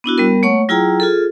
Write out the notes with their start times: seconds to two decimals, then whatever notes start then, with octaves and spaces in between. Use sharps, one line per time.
0.04 B3 D4 E4 F#4
0.18 G3 B3 A#4
0.43 A3 A#3 C#5 F#5 C#6
0.69 F#3 E4 F4 G#4 G5 A#5
1.00 F4 G#4 A4